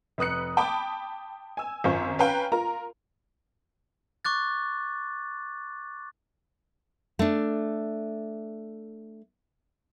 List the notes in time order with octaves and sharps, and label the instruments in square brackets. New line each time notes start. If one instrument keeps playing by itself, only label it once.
[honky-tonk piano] F1 B4 D#6 F#6 C#7
G5 A5 B5 D6 D#6
G#5 E6
G#1 F#2 F4 C5 G#5 C#6
C#4 B4 F5 G5 A#5
F4 A#4 A#5
[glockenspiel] C#6 D6 F#6 A6
[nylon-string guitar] A3 D4